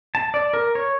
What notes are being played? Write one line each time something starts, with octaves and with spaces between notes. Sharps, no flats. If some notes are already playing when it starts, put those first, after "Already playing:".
A5
D5
A#4
C#5